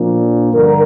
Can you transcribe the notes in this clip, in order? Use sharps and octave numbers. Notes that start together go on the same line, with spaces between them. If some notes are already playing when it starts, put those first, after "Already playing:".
Already playing: A#2 F3 A#3 D4
G2 D3 A#4